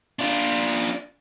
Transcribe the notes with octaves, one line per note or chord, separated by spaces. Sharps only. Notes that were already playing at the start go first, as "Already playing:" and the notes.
D4 F4